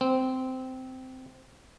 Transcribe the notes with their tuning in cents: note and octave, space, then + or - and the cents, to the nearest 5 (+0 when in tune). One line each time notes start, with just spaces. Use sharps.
C4 -15